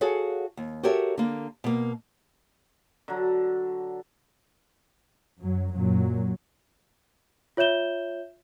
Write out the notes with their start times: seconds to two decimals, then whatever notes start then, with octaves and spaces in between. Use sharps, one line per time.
0.01 F#4 G#4 A4 C#5 F5 F#5
0.57 D#2
0.83 F#4 G4 A4 A#4 C#5 E5
1.18 D3 A#3
1.64 B2 A#3
3.08 D3 F#3
5.39 F#2 F#3
5.75 F#2 A#2 F#3
7.57 F4 C#5 E5 G6 E7 G7